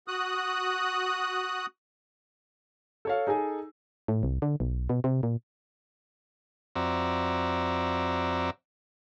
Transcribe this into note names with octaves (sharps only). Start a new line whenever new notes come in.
F#4 D#6 F#6
A4 C#5 F5
D#4 G#4 A4 G#5
A2
C2
D3
B1
B2
C3
A#2
F2 C4 F#4 D5 E5 A#5